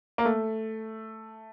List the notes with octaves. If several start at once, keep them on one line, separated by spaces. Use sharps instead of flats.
A#3
A3